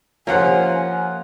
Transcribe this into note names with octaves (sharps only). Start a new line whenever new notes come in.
F3 A#3 C#4 F4 G4 C5 F#5 G#5